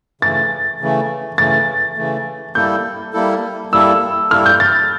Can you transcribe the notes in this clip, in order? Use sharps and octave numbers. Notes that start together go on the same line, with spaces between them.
C#3 E3 A3 A6
C#3 E3 A3
C#3 E3 A3 A6
C#3 E3 A3
G3 A#3 E4 A4 G6
G3 A#3 E4 A4
G3 A#3 E4 A4 E6
G3 A#3 E4 A4 F6
G6
A6